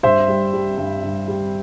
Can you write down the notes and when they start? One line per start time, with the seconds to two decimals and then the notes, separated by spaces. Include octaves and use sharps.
0.03 G2 C5 E5
0.28 G3
0.53 G3
0.78 G2
1.03 G2
1.28 G3